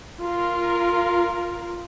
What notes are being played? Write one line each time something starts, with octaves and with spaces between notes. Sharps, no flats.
F4 A#4